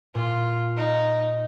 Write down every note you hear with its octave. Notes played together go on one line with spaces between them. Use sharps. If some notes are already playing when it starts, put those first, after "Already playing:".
A#2 F4
D#4